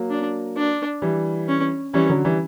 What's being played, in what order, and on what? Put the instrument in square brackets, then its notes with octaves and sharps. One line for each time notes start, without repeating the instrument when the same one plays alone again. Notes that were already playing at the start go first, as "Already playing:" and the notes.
Already playing: [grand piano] F#3 A#3
[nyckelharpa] D4
D4
[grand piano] E3 G3
[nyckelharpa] C#4
[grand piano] E3 G3 [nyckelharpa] C#4
[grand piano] D3 F#3
E3 G3